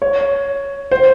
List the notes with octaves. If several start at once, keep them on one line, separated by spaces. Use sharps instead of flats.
C#5
C5